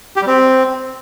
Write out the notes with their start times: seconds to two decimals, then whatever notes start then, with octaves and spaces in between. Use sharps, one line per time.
0.16 G4
0.22 G3
0.27 C4